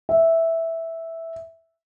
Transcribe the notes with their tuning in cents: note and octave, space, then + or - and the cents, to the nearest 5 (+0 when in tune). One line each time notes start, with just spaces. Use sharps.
E5 -5